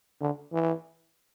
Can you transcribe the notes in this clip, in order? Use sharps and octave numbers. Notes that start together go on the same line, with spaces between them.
D3
E3